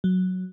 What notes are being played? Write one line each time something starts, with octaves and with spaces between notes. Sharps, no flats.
F#3